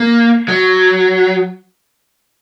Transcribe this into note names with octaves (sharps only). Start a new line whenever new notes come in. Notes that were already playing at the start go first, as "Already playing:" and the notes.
Already playing: A#3
F#3